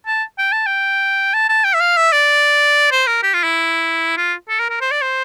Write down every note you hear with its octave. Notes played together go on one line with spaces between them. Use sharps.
A5
G5
A5
G5
A5
A5
G5
E5
F5
E5
D5
C5
A#4
G4
F4
E4
F4
A4
A#4
A#4
C5
D5
C5